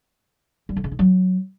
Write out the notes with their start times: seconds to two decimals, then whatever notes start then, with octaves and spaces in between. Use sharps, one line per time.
0.69 G3
0.77 D3
0.84 C#3
0.92 D#4
0.99 F#3